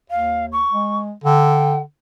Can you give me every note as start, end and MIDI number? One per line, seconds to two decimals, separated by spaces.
0.10 0.64 39
0.10 0.45 77
0.52 0.97 85
0.72 1.12 56
1.24 1.81 50
1.24 1.78 79